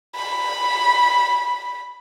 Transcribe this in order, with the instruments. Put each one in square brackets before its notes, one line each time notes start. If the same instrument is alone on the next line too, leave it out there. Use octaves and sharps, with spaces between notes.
[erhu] B5